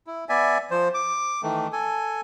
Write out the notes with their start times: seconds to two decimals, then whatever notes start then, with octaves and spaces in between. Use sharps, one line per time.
0.07 E4
0.29 B3 D5 E5 G#5
0.71 F3 C5
0.94 D6
1.43 D#3 E3 A3
1.73 A4 G#5